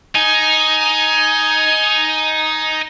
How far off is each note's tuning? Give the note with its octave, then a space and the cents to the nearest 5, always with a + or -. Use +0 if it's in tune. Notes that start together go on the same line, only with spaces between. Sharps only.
D#4 +5 G#5 +15